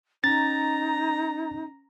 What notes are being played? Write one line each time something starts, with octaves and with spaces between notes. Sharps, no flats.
C#4 D#4 A#5 A6